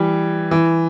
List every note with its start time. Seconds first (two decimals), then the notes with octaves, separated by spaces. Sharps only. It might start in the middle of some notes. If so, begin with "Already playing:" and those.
Already playing: E3 G3
0.51 E3